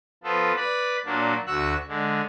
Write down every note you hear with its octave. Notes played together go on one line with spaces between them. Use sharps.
F3 B3 F4 A4
B4 D5 B5
A#2 F#3 A#3 D4
D2 F#4 E6 F#6
D3 G#3